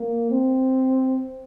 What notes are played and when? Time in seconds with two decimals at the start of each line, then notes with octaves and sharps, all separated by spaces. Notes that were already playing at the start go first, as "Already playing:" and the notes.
Already playing: A#3
0.30 C4